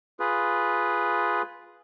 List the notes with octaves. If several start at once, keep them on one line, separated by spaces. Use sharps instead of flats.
F4 G#4 B4